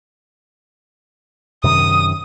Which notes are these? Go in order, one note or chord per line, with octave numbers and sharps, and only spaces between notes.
F#2 C3 D#3 D#6